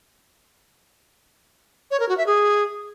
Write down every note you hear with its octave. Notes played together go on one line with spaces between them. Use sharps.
C#5
A#4
F#4
E5
G#4